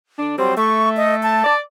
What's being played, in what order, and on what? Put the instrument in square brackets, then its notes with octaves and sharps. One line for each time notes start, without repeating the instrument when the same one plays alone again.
[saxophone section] D3 D4
[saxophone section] F#3 G3 C4 [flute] C5
[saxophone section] A3 [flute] C#6
[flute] D#5
A5
[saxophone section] D5